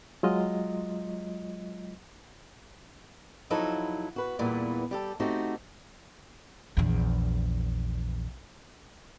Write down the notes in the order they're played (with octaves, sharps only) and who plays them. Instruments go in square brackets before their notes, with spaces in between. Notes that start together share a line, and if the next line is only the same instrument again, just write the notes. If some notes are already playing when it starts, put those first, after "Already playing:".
[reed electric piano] F#3 G#3 F4 D#5
[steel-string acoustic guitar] F3 F#3 D#4 E4 A4
F#4 B4
E2 A#2 E3 G3 B3
G3 G4 A4
A3 C4 D#4 F#4 G4
[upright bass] A#1 E2